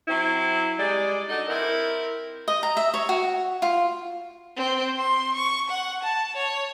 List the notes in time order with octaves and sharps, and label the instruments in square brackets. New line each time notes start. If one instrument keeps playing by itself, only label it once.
[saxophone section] F#3 C4 E4
G3 G#3 G#4 D5
D4 D#4 F#4 A4
C4 E4 A#4
[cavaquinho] D#5
A#5
E5
C#5
F#4
F4
[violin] C4
C6
C#6
F#5
A5
C#5